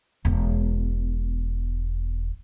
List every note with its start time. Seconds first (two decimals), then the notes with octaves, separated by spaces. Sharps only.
0.25 E1 B3